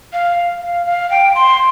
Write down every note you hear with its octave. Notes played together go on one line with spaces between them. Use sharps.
F5
F5
F5
G5
C6